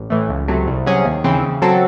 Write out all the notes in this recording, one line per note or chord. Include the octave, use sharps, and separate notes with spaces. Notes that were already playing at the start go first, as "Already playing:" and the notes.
Already playing: A1
A2 E3 A3
C#2
C3 F#3 A3
C2
C3 F#3 C#4 G#4
D#2
C#3 E3 C4
C#3
F#3 C4 F#4 A4